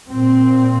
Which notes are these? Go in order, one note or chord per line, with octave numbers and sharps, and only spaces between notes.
A#2 C4